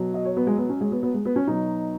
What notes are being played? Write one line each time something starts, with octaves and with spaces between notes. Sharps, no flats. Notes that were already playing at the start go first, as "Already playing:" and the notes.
Already playing: B2 F#3
D#5
C#5
B3
G#3
B3
C#4
G#3
B3
B3
G#3
B3
C#4
B2 F#3 D#4